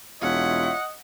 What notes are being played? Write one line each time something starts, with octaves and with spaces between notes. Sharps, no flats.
E1 F4 C#5 D#5 E5 F#5